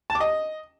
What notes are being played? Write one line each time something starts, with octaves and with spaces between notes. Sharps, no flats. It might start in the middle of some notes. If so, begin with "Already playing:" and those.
A5
D6
D#5